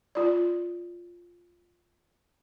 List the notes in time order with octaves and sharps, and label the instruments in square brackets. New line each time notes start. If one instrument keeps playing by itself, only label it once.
[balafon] F4 D5